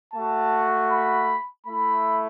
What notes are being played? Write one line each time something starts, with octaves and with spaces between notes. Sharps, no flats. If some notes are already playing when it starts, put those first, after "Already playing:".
A3 F#4 A5
B5
A3 E4 B5